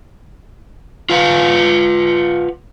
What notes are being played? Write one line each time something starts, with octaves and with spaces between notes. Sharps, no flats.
F4 B4 F5 F#5